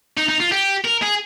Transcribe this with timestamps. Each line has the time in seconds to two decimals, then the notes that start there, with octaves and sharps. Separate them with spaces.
0.18 D#4
0.29 D#4
0.40 F4
0.52 G4
0.84 A#4
1.02 G#4